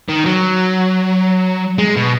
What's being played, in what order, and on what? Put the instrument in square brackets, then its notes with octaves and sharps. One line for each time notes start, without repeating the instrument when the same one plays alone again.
[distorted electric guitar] D#3
F#3
G#3
B2